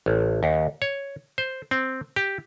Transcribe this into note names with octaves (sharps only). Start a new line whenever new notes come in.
A1
D#2
C#5
C5
C4
G4